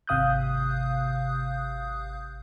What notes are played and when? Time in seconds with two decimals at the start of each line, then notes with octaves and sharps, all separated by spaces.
0.07 G#1 C3 F5 D#6 F#6 G6